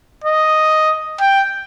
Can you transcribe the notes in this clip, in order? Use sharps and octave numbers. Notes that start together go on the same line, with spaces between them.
D#5
G5